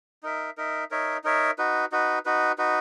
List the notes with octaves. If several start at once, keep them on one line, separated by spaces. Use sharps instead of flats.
D#4 A#4 E5
D#4 A#4 E5
D#4 A#4 C#5 E5
D#4 A#4 C#5 E5
D#4 F#4 B4
D#4 F#4 B4
D#4 F#4 B4
D#4 F#4 B4